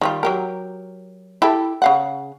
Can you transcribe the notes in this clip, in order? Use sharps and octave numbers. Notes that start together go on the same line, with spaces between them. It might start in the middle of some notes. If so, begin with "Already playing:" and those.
D#3 G3 F4
F#3 G4 A#4
E4 G4 A4
C#3 F5 F#5